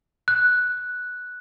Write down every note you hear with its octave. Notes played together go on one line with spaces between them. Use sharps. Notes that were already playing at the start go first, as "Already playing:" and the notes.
F#6